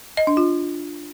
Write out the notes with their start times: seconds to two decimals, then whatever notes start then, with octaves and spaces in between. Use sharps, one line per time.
0.17 D#5
0.27 D4
0.37 F4